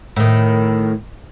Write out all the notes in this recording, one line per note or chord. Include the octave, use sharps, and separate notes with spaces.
A2 D#3